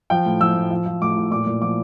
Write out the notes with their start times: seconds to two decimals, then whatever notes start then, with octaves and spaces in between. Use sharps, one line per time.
0.10 F3 G5
0.26 A2
0.40 F3 E6
0.55 A2
0.71 F3
0.86 F3
1.02 A2 D6
1.17 A2
1.31 A#2 D6
1.46 A#2
1.61 F3 D6